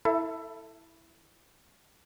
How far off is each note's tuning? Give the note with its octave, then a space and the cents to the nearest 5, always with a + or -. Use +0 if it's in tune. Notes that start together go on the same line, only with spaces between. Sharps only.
E4 -5 A4 +15 E5 +30